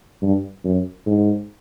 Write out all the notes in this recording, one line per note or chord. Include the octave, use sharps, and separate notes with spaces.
G2
F#2
G#2